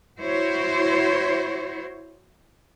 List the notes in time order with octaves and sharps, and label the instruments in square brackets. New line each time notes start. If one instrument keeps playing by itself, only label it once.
[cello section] E4 F#4 C5 C#5